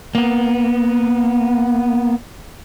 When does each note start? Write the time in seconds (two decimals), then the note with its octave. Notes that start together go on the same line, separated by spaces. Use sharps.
0.15 A#3 B3